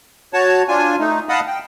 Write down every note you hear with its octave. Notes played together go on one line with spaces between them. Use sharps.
F#4 C#5 A5
D4 F4 G#5
A3 D#4
D#5 F5 F#5 A5 B5 D#6
G5